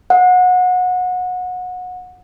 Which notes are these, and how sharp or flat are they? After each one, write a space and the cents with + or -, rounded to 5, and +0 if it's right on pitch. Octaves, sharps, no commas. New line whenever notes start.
F#5 -25